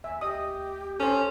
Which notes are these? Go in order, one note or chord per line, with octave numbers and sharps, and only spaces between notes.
D#2 E5 G#5
D2 G4 D#5 D#6
C#4 A4 C5